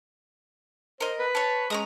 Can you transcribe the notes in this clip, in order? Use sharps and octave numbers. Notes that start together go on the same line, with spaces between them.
A#4 C5 D#5
B4
C#5 A5
G#3 C#4 A#5 D#6